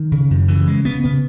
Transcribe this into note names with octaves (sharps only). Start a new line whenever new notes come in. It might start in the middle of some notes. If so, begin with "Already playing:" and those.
Already playing: D#3
C#3
F#2
C#3 E3
C#3 G#3
C#3 B3
C#3 B3